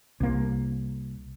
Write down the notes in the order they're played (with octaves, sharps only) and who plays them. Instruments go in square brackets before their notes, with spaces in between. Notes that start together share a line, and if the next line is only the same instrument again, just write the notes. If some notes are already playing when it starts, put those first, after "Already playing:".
[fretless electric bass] C2 A#3